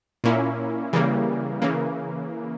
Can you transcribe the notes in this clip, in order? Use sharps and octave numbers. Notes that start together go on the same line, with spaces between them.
A#2 A#3 C#4 E4
C#3 E3 G3 A#3
C#3 E3 A#3